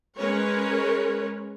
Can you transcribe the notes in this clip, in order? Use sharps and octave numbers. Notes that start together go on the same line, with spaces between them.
G#3 C#4 A#4 B4 C#5